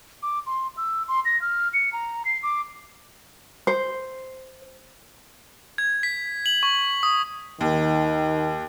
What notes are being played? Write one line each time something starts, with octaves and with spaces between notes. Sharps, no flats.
D6
C6
E6
C6
A#6
F6
C#7
A#5
C7
D6
C5
G#6
B6
F#7
C#6
D#6
D#2 D#3